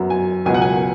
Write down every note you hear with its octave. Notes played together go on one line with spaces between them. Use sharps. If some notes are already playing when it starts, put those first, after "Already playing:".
Already playing: F#2 F#3 B3
G#5
C#2 B2 F#3 B3 G#5
F#5
G#5